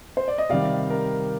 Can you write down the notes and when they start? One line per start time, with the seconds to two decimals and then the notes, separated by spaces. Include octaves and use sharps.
0.17 C5
0.28 D5
0.38 D#5
0.50 C3 D#3 G3 D5 F5
0.90 A#4